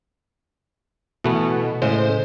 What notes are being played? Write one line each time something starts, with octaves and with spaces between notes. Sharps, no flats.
B2 E3 A3 B3
A2 C#3 G#3 C5